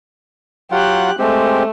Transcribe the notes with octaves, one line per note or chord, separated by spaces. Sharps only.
F#3 F4 G4 F#5 F#6
G#3 A3 C4 G4